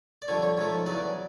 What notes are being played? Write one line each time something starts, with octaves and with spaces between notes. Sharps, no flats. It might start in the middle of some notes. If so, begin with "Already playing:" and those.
D5
F2 D3 G3 C#5
C#5
G#2 F3 A3 C#5
E2 C#3 F#3 D5